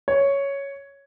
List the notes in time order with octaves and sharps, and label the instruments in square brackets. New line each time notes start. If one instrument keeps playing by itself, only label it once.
[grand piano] C#5